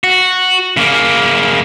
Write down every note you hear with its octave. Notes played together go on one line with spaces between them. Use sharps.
F#4
C#3 A#3